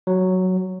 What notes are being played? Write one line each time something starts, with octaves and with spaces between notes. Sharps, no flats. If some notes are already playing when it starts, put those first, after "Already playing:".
F#3